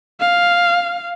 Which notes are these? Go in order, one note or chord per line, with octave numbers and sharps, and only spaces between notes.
F5